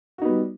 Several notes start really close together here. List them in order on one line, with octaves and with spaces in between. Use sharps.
F#4 D#4 B3 G3